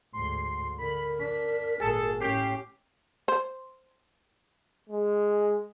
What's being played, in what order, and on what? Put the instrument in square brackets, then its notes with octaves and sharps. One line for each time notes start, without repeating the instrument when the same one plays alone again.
[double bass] D2 G#2 [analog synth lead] C6
[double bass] D3 [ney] A#4 [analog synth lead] B5
[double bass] D4 [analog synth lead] B6
[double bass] G#1 A#2 [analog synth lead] G#4 [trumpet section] A4 A5
[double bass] A2 C#4 [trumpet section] G4 [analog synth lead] C7
[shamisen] C5
[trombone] G#3